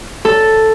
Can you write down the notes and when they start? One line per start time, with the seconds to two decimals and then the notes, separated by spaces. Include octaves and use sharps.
0.25 A4